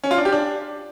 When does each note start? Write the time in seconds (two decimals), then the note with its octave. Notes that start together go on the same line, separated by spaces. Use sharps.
0.04 C#4
0.11 F4
0.18 D4
0.25 G4
0.32 D4